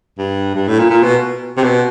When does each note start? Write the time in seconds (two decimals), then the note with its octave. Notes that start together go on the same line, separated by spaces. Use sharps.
0.18 G2
0.55 G2
0.67 A2
0.79 A#2
0.90 A#2
1.03 B2
1.57 C3
1.63 B2